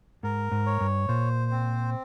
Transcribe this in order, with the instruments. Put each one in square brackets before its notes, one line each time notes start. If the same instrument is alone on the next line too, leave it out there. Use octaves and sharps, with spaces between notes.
[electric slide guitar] G#2 [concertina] A#4
[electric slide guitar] G#2
[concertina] C#5
[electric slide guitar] G2
[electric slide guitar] A#2 [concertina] C5
[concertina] C4